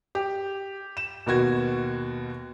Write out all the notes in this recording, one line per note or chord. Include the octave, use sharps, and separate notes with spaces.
G4
E7
D#2 B2 F#4 G#6